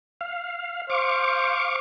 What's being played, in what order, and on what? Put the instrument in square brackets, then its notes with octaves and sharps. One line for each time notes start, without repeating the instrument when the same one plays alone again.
[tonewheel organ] F5
[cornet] C5 [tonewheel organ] F5 C#6 D6